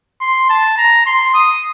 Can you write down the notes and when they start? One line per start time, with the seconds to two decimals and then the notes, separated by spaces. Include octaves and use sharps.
0.21 C6
0.50 A5
0.77 A#5
1.06 C6
1.34 D#6